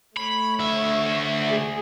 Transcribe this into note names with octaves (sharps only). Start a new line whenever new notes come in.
A3 C#5 B5
D2 E5
G#4